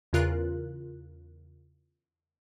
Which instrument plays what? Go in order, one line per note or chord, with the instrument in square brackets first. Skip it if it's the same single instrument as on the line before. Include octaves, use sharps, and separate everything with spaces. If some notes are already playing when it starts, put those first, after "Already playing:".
[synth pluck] E2 C#3 F4 A#4 F#6